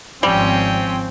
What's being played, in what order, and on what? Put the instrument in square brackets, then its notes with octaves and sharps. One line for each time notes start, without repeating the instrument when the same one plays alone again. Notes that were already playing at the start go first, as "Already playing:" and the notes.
[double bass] G#1 F3 [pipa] G3 [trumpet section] C4 [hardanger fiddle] C#4 G5